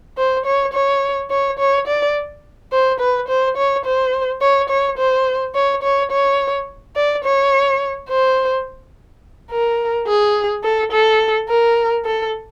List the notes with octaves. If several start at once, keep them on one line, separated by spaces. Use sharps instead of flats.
C5
C#5
C#5
C#5
C#5
D5
C5
B4
C5
C#5
C5
C#5
C#5
C5
C#5
C#5
C#5
D5
C#5
C5
A#4
G#4
A4
A4
A#4
A4